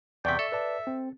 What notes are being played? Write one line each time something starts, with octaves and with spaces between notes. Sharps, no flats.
E2 C3 D5 G5 C#6 B6
A4 E5
B4 D5 A5
C4